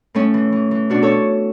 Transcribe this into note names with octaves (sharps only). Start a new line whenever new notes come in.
A2 A3 C#4
E3
E3
E3
B2 D4 F#4
A4 C#5